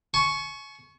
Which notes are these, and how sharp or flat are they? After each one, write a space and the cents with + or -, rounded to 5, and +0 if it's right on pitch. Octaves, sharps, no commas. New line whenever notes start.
G#5 +45 C#6 +0